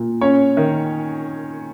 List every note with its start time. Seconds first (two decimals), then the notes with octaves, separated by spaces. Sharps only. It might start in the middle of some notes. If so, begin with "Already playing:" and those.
Already playing: A#2
0.21 C#4 C#5
0.57 D#3